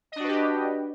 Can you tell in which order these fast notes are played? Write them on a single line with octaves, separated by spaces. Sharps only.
D#5 D4 F#4 B4 G4